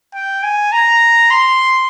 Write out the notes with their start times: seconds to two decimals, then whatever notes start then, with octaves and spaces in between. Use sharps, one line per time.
0.14 G5
0.43 G#5
0.72 A#5
1.31 C6